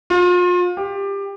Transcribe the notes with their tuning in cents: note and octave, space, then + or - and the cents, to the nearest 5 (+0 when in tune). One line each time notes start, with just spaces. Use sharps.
F4 +35
G4 +20